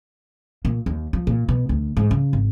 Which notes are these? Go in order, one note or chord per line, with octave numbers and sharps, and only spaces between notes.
A#2
D#2
F3
A#2
B2
D2
G#2
C#3
G#1